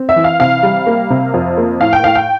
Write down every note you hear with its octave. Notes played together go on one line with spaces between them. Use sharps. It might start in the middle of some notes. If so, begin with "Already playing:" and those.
Already playing: C4
E5
E3
F5
C3 F5
G3
A#3
C3
F2
A#3
A2 F5
G5
A2 F5
G5